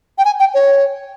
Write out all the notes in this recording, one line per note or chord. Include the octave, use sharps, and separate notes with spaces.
G5
G#5
G5
C#5